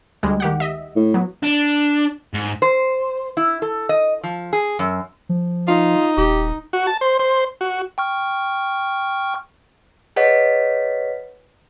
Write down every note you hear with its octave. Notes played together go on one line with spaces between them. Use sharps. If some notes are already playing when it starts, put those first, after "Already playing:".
D2 G3 G#3
D#3 G4 F#5
D#5 E5
A2
F#3 B3
D4
G#2
C5
E4
A4
D#5
F3
G#4
F#2
F3
D#4 F4
D#1 G4
F#4
A5
C5
C5
F#4
G5 C#6 F6
G#4 B4 C#5 D#5 F#5 B6